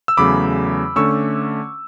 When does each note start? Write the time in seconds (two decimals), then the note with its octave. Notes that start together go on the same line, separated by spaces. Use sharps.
0.08 E6
0.17 E2 C#3 F#3 A3 B5 D6
0.96 D3 A3 C#4 C#6 E6